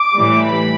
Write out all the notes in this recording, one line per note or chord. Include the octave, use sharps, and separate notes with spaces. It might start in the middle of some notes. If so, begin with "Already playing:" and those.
Already playing: D6
A2 E3 G3
B5